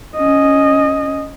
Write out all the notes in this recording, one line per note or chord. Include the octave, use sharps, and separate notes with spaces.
C#4 D#5